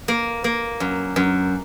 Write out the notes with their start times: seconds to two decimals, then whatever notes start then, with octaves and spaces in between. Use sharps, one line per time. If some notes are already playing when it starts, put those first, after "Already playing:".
0.08 A#3
0.44 A#3
0.80 F#2
1.16 F#2